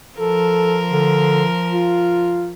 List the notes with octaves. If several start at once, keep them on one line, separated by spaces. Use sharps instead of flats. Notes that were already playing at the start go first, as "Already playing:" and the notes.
F3 A4 A#4
D3
F4